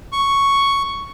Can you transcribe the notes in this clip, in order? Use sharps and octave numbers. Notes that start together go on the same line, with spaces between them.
C#6